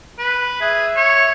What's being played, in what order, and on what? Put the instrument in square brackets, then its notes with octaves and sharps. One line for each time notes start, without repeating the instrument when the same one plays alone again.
[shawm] B4
[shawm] G#4 [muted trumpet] E5
[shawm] C#5